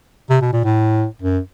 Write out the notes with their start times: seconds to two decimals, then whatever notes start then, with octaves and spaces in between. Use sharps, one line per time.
0.30 C3
0.41 B2
0.53 A#2
0.64 A2
1.22 F#2